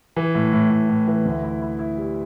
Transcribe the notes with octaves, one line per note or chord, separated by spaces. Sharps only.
E3
A2
A2
A2
A2
E3
D2
E4
E4
E4
G3